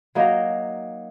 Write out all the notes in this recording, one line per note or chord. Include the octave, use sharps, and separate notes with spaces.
F#3 A#3 D#4